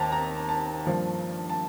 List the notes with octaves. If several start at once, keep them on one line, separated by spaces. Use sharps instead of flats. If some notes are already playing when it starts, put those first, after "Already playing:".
Already playing: D#2 C4 A5 A#5
A#5
A5
G2 F3 A#3
A5